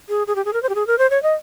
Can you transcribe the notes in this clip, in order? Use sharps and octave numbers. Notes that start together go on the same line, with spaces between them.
G#4
G#4
G4
G#4
A#4
C5
G4
G#4
A#4
C5
C#5
D#5